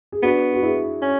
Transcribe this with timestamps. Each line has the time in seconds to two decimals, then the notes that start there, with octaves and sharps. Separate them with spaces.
0.12 G#4
0.23 B3 D4 F#4
0.54 F#4
0.62 E4 G#4
1.02 C#4